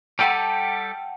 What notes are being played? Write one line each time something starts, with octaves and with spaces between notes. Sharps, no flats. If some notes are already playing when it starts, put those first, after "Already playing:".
G3 G4 A4 F#5 G5 A5